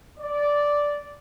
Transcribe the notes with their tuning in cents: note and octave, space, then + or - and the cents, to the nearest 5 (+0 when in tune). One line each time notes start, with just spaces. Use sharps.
D5 -5